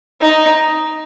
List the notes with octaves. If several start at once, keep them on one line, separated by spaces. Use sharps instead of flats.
D#4